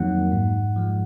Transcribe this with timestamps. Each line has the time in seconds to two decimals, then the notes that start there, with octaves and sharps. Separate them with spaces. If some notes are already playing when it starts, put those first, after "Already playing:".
Already playing: F2 D#3 F#3 A#3 F#5
0.32 G#2
0.76 F3 G#3